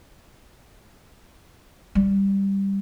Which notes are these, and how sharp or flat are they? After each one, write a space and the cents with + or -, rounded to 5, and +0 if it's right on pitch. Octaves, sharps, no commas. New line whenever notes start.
G3 +5